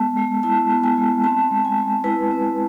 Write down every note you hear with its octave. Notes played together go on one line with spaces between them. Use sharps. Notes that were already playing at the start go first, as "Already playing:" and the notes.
Already playing: G#3 B3 A5
G#3
E4 A5
B3
G#5
G#3
C4 A5
G#3
G#5
G#3
E4 B4
C4